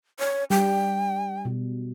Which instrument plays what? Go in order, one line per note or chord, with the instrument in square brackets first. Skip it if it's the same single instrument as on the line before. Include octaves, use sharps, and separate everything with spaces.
[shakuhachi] C#5
[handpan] G3 [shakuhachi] G5
[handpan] B2